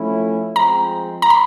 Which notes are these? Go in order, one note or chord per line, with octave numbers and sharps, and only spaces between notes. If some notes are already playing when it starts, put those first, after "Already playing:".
Already playing: F3 A3 C#4 E4
F3 G#3 C4 A#5
A#5
B5